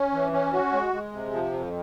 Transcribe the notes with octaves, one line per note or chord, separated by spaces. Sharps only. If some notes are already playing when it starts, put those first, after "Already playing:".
Already playing: C#4
E3
C#4
F#4
G#3
G#3
C3
F3
F2